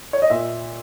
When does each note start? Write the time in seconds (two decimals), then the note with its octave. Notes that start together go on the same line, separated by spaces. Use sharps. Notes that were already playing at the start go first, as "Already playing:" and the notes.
0.13 C#5
0.22 D#5
0.30 A#2 E5